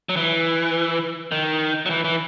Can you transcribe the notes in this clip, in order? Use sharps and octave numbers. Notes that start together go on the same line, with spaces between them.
F#3
E3
D#3
F#3
E3
E3